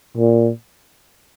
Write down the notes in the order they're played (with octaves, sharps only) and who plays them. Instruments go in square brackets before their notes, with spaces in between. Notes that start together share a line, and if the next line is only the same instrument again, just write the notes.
[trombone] A#2